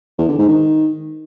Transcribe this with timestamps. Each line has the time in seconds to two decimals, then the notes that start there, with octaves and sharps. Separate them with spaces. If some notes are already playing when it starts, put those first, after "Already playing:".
0.18 E2
0.29 D3
0.39 G#2
0.49 D#3